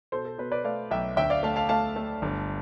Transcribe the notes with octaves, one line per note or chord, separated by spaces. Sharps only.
B2 A4 C5
A4
B2 B4
B4 D5
A3 D5 F5
B1 E5 G5
D2 E5 G5
D5 F5
A3 F5 A5
F5 A5
A3 F5 A5
A3
G1